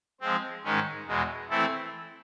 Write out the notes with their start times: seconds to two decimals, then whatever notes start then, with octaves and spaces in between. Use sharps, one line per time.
0.21 F3 G#3 C4
0.64 G#2 D#3 G#3 C#4
1.07 E2 B2 G#3
1.50 E3 A3 C4 E4 A4